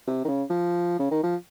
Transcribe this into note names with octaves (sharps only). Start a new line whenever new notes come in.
C3
D#3
C#3
F3
C#3
D#3
F3